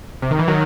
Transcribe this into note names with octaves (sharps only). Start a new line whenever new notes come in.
C3
D#3
E3
D#3 F#3